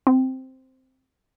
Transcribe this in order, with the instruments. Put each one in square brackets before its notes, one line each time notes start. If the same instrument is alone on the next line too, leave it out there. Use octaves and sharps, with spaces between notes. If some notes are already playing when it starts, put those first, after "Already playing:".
[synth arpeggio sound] C4